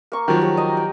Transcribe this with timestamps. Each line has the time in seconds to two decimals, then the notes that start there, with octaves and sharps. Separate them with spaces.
0.12 A#3 C#6
0.28 D#3 F3 F#3
0.41 G4 C#5
0.57 D#5 A#5 C#6
0.77 G5